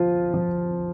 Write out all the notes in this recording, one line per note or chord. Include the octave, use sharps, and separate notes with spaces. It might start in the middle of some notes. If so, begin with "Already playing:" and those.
Already playing: F3 F4
F3